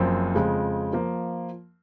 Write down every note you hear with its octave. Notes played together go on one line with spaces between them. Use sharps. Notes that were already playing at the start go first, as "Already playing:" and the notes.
Already playing: F#1 F#2 F3 C4
F2 C#3 G#3
F3 A#3